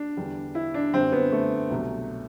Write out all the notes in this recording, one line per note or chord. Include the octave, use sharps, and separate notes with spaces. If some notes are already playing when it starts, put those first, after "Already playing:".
Already playing: D4
E2 D3 G3
E4
D4
G1 F#2 D3 G3 C4
B3
A3
C2 B2 F#3